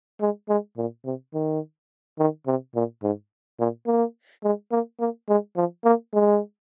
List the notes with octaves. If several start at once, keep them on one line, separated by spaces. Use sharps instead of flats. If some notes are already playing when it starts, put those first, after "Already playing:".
G#3
G#3
A#2
C3
D#3
D#3
C3
A#2
G#2
A#2
A#3
G#3
A#3
A#3
G#3
F3
A#3
G#3